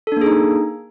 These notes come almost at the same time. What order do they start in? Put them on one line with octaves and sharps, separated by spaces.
A4 D4 A#3 G#4 D#4